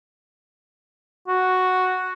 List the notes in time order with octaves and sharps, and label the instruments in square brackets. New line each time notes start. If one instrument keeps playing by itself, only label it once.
[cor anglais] F#4